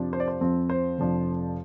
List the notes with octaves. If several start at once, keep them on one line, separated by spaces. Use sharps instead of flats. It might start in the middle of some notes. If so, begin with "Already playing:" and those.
Already playing: F2 C3 F3 D4
C5
D5
C5
F2 F3 C4
C5
F1 F2 F3 D4